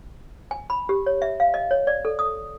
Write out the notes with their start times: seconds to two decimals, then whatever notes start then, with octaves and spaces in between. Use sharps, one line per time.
0.51 G#5
0.70 B5
0.89 G4
1.06 C#5
1.22 E5
1.40 F5
1.54 D#5
1.71 C#5
1.87 D5
2.05 A4
2.19 D#6